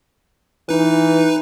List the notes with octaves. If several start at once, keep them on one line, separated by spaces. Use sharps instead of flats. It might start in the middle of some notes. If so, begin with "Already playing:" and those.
E3 D#4 B4